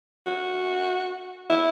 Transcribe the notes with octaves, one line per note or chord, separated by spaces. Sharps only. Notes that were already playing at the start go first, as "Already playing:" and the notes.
F#4
E4